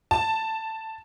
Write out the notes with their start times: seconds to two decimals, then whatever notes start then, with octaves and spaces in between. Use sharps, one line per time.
0.11 A5